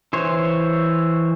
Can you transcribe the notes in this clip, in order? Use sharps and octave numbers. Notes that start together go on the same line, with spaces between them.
E3 C5 C#5